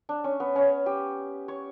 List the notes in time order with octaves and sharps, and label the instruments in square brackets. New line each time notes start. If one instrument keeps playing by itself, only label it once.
[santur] D4
C#4
B3
C#4
G4
C#5